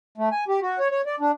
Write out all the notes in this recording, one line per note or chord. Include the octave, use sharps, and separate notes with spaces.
A3
G#5
G4
F#4
C#5
C#5
D5
D4